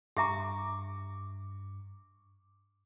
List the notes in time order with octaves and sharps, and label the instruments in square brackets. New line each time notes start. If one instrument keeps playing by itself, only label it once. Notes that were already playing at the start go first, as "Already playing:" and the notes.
[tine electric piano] G2 [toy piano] G4 E5 A#5 [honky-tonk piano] C#6 D6